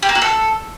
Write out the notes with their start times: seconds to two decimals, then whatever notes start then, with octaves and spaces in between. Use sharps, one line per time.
0.02 G4
0.09 A#3
0.15 F#4
0.22 A4